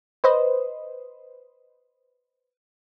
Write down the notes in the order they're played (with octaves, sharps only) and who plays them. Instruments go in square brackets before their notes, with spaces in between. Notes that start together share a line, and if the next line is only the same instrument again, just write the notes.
[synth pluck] B4 C5 D#5